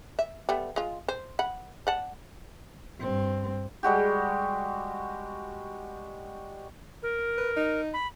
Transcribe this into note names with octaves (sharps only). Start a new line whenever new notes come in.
E5
G3 A3 B3
G#3 F4
C5
F#5 B5
D5 F#5 A5
G2 C4
G3 G#3 F#4 G4
A#4
B4
D#4
B5